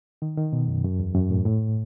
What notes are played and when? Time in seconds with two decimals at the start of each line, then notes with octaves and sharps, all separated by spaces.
0.22 D#3
0.37 D#3
0.53 B2
0.68 F#2
0.84 F#2
0.99 E2
1.15 F#2
1.30 A2
1.45 A2